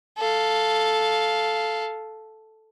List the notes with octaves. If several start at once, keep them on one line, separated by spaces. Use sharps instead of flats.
A4 F5